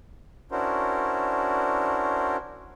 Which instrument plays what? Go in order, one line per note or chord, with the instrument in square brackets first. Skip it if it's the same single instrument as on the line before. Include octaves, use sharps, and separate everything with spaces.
[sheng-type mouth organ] C#4 D4 E4 F#4 A#4 C5